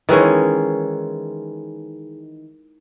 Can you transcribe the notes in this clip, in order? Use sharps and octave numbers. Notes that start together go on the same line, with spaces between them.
D#3 E3 G#3 C#4